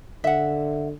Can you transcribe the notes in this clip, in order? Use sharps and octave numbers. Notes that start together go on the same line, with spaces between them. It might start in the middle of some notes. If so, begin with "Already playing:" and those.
D3 E5 F#5